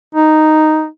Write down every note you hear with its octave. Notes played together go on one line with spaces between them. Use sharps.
D#4